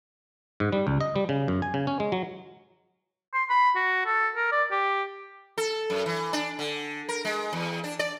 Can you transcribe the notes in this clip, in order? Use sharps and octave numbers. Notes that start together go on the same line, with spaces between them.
G#2
G3
C#2
D#5
G3
C#3
F#2
G#5
C#3
C#4
G#3
F#3
C6
B5
F#4
A4
A#4
D5
G4
A4
F#2
E3
D4
D3
A#4
G#3
E2
D4
D5